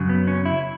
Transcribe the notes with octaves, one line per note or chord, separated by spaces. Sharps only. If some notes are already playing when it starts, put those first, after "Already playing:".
Already playing: F#2 C#3 F#3
B3
C#4
E4